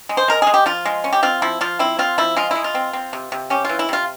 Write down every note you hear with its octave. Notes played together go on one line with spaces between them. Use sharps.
G#3
C5
G#3 A#4
G#3 G#4
G4
F3 F4
G#3
C#4
G4
C4 F4
F3 E4
F3 F4
C4 E4
C4 F4
F3 E4
G#3 F4
G#3 E4
F4
C4
C4
C3
C3
C#4 G4
E3 F4
E4
C3 F4